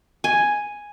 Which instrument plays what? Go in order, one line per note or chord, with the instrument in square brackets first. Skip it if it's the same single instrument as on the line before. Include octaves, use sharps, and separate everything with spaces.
[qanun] G#5